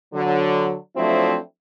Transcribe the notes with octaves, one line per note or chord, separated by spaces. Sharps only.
D3 F#3
F3 F#3 A3 C4 D4 E4